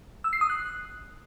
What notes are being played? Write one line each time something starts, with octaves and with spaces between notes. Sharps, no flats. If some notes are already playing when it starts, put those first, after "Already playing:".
E6
C7
D#6
F#6